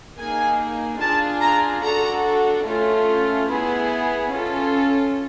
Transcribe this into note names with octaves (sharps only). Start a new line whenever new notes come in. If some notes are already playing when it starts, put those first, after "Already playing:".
A#3 D#4 G#4 G#5
D4 F4 G#4 A5
A#5
D4 F#4 A4 A#5
A3 C#4 F4
B3 E4 G#4
C#4 F4 A4